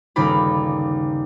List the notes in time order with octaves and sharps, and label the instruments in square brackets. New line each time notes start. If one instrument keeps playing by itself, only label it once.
[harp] G1 D#2 C#3 D#4 D5 B5